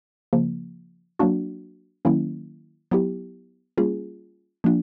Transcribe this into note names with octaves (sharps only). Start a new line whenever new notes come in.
C#3 F3 A#3
F#3 A#3 D4 F#4
D#3 F#3 A#3 C#4 E4
F#3 B3 E4 G4
G3 A#3 C#4 F4 G#4
F3 A#3 D4 F4